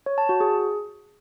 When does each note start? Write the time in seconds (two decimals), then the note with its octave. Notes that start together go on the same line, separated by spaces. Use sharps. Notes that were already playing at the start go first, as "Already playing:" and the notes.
0.06 C#5
0.18 A5
0.29 F#4
0.41 G#4